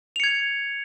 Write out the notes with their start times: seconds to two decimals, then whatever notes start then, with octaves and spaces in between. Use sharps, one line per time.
0.16 F7
0.20 C#7
0.24 G#6